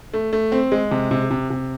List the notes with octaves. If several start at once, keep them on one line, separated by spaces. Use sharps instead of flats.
A3
A3
C4
G#3
C3
C3
C3
C3